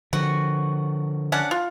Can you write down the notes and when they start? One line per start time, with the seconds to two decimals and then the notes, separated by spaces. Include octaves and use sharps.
0.13 D3 F3 F#4
1.32 C#4 D4 F#5
1.51 F4